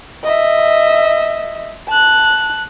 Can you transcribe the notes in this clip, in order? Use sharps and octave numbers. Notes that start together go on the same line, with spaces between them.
D#5 E5
A5 F#6